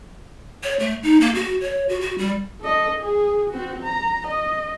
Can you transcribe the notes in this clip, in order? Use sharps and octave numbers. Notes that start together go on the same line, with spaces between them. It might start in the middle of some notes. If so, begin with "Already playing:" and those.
C#5
A3
D#4
A#3
F#4
C#5
F#4
F#4
G3
A4 D#5
G#4
C4 F#4
A#5
D#5